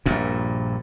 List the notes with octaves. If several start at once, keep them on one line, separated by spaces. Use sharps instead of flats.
A#1 G2 A#2